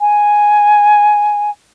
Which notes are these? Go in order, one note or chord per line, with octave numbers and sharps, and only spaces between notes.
G#5